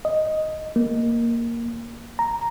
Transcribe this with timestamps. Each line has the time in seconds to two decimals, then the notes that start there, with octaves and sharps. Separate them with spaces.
0.05 D#5
0.76 A#3
2.19 A#5